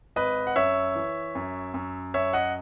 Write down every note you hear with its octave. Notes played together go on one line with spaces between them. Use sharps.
G#1 B4 D#5
F#5
F#2 C#5 E5
E3
F#2
F#2
F#2 C#5 E5
D#5 F#5